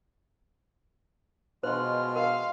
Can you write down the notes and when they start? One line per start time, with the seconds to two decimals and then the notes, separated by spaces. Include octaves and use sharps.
1.63 B2 G#3 F4 C5 C6 F6
2.16 A#4 F5